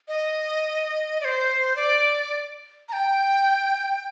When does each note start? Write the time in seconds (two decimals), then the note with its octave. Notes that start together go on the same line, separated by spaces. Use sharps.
0.08 D#5
1.21 D5
1.25 C5
1.76 D5
2.89 A#5
2.93 G5